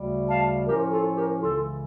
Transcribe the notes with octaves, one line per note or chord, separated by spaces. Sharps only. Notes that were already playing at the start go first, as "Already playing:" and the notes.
Already playing: D2 C#3 G3
F5 A5
A2 F3 C#4 F4 G4 A#4
F4 A4
G4 A#4
C#2 C#3 E3 F4 A4